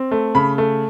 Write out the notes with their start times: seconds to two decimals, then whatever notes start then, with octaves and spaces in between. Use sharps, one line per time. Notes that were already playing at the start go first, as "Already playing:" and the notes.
Already playing: C4
0.11 A3
0.35 C#3 B5
0.58 A3